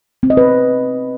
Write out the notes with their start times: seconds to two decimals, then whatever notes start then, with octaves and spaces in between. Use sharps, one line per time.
0.23 C4
0.30 D#5
0.37 B4